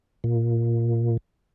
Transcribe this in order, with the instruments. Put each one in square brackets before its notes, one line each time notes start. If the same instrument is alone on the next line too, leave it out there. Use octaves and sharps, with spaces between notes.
[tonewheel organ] A#2